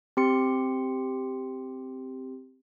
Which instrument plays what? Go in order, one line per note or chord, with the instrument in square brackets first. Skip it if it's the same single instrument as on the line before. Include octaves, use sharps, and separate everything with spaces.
[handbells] C4 G4 C6 C#7